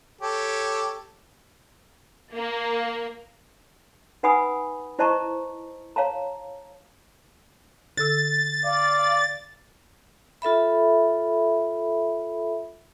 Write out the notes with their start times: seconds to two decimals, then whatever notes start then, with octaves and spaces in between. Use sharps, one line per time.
0.21 G4 A4 C#5
2.34 A#3
4.23 D#4 B4 F#5 G#5 B5 D#6
4.99 E4 C5 D#5 A5 A#5 C#6
5.96 C#5 F5 A5 A#5
7.97 D3 A4 E6 A6
8.64 D5 F5
10.42 F4 A4 E5 B5